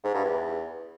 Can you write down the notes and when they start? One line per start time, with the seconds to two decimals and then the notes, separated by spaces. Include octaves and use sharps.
0.04 G#2
0.14 G2
0.24 E2